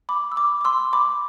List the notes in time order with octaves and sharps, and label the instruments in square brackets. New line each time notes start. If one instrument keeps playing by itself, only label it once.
[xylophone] B5 D6
E6
B5 D6
D6
C6 E6
B5 D6